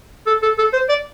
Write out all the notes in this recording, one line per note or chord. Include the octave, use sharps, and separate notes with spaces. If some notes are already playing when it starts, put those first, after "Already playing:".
A4
A4
A4
C5
D5